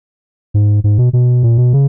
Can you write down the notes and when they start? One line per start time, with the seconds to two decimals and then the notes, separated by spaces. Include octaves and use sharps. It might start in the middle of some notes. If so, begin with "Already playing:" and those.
0.54 G#2
0.84 G#2
0.98 B2
1.13 B2
1.43 A#2
1.58 B2
1.73 C#3